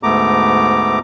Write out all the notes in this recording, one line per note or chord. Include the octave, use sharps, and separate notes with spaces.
D2 G#2 A3 B3 A#5 D6